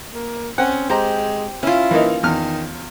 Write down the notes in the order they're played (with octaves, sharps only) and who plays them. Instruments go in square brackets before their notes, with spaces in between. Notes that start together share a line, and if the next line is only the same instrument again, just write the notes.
[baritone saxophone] A#3
[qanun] C4 [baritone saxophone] C#4 [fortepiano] F#5
[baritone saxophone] G#3 [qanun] G4 [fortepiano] C5 A#5
[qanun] C#4 F4 [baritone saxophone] E4
[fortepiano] E3 A#3 D#4
[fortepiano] E2 F6 [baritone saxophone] D#3